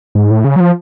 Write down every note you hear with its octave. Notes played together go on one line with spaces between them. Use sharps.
G#2
A2
C#3
F#3
F3